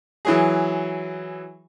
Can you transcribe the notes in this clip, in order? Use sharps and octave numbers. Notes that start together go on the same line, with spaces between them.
E3 F#3 G#4